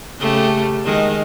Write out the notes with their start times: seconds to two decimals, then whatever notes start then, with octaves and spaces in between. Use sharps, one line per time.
0.20 C#3 A3 G4
0.85 D#3 G#3